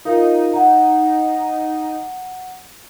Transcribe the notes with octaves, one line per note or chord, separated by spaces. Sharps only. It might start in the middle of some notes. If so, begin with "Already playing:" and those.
D#4 F4 A#4 F5
F#5 A#5